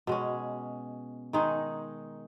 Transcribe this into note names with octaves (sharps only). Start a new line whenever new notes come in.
B2 G#3 C#4
D#3 G#3 D#4